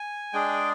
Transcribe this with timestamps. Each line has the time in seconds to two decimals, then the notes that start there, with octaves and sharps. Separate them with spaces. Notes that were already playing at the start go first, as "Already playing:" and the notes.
Already playing: G#5
0.33 G#3 D4 G#4 G5